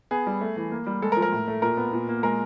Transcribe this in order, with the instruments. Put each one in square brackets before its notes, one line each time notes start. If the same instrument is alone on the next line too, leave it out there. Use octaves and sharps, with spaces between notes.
[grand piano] B3 G#4
G3
A3
E3
A#3
G3
G#3 A4
A#4
F3
A#4
A2
A3
A#2 A#4
B3
A#2
A#3
G#3 A#4